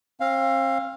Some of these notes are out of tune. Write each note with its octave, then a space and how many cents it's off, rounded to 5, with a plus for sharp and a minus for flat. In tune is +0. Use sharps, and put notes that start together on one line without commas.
C4 +40 F5 +0